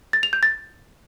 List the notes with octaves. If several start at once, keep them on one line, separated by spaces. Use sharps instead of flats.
A6
F7
G6
A6